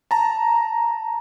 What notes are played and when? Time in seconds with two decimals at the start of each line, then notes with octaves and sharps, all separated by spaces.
0.11 A5 A#5